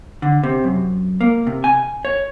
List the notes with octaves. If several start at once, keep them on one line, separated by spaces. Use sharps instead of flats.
D3
C3
F#2
A#3
C3
G#5
C#5